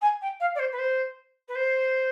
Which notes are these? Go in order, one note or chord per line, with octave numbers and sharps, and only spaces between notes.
G#5
G5
F5
D5
C5
B4
C5
B4
C5